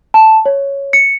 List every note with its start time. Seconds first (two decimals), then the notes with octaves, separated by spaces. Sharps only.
0.14 A5
0.46 C#5
0.93 C#7